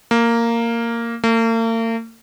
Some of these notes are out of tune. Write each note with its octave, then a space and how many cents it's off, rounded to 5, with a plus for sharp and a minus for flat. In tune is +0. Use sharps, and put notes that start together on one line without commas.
A#3 -10
A#3 -45